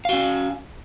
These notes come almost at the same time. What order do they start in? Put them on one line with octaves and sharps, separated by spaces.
F5 F#4 C#4